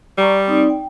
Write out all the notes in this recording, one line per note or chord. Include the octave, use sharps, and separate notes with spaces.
G3 D5 A#5 C#6
C4 D#4 D5
G5